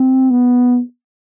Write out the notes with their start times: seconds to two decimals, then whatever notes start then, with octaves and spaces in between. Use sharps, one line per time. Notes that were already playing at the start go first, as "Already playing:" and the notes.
Already playing: C4
0.31 B3